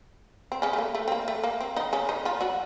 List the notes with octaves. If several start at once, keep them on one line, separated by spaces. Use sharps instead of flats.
C4
C#3 C#4
A3
A#3
A3
C4
A#3
A3
A#3
C4
D#3 D#4
C#3 C#4
D#3 D#4
F3 F4
F#3 F#4